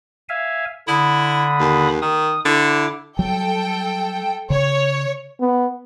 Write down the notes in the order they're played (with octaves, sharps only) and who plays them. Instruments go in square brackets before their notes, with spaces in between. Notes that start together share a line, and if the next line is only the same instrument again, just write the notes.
[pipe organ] E5 F5 G#5
[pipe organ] D3 B5 D#6 [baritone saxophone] E4
[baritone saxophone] D#2
[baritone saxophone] D#3 [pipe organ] D#6
[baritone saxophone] D3 [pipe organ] E4 D6
[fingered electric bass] F#3 G3 [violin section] A4 G5
[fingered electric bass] C#3 [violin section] C#5
[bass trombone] B3